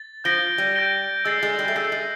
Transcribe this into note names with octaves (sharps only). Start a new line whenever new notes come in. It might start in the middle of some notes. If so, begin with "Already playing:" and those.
Already playing: A6
F3 G6 A#6 D7 G7
G3
G6 A#6 D7 G7
G#3 E6 A6 C7
G#3
G3
A3
G#3 E6 A6 C7
G#3